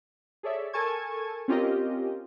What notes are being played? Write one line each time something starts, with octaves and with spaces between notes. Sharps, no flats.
G#4 A4 C#5 D5 E5
A4 A#4 G#5 A5 C#6 G#6
C4 C#4 F4 G4 A#4 D#5